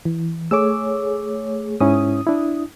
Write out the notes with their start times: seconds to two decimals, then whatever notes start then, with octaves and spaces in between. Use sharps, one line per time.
0.05 E3
0.51 A3 G#4 C#5 D6 E6
1.80 G#2 C#4 E4 D#6
2.27 D4 E4